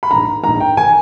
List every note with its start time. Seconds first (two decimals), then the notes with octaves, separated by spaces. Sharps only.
0.03 B5
0.10 A#1 G#2 D#3 A#5
0.43 A#1 G#2 D#3 A#5
0.60 G5
0.77 D#3 G#5